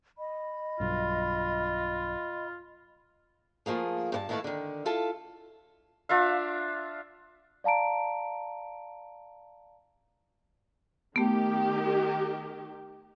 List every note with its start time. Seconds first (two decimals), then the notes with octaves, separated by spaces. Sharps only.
0.18 D#5 B5
0.80 B1 G2 F4
3.66 F3 A3 A#3 G#4
4.12 G2 B4 A5
4.29 D#3 A3 E4 A4 B4 F5
4.44 D3 D#3
4.86 E4 F4 A4 E5 A5
6.09 D4 F4 E5 F5
7.64 D5 F5 A5 A#5 D7
11.16 D#3 A3 B3 G4